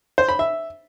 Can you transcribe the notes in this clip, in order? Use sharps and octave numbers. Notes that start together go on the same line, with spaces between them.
C5
B5
E5